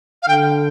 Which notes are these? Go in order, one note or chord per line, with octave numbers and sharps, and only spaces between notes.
F5
D3 G5